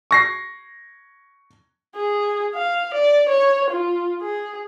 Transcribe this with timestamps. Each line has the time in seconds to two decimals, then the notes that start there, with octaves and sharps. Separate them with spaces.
0.11 C#6 A#6 C7
1.96 G#4
2.54 F5
2.93 D5
3.28 C#5
3.70 F4
4.22 G#4